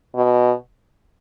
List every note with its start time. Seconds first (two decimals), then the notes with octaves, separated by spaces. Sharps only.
0.15 B2